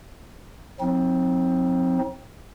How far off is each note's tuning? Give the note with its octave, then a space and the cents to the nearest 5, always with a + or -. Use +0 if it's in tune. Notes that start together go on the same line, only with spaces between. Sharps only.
F3 +45 C4 +0 D#4 +30